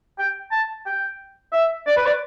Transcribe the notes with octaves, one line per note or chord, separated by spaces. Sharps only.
G5
A5
G5
E5
D5
B4
D5